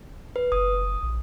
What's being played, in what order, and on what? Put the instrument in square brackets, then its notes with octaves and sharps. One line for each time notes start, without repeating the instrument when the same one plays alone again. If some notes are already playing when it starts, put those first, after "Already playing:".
[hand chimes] B4
[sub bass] F#1 [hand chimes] D#6
[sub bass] A#1